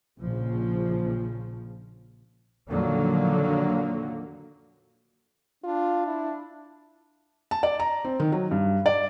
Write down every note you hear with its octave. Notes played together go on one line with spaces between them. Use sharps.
A#1 C#3 F3
F2 A#2 D3 D#3 F#3 A#3
D4 F4
E4
A5
D5
A#5
C4
D#3
F#3
G2
D5